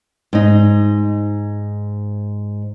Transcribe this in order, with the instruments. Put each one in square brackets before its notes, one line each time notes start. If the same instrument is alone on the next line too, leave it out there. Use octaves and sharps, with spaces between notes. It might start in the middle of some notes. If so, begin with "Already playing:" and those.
[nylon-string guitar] G#2 D#4